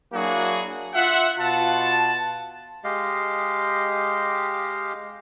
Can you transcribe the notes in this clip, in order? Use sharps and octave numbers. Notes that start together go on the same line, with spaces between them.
F#3 A#3 D4 E4 F#4 G#4
F4 E5 F#5
B2 F4 F#5 A5
G#3 G4 D#5 F5